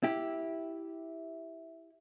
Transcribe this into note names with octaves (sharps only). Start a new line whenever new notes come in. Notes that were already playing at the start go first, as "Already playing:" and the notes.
E4 G4